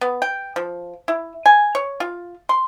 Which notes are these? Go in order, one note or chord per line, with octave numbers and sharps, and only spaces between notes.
B3
G5
F3
E4
G#5
C#5
F4
C6